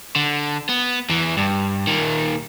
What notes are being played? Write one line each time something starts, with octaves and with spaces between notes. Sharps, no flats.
D3
B3
E2 E3
G2
A#2 D#3